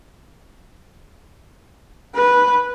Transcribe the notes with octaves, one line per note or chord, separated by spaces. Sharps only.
B4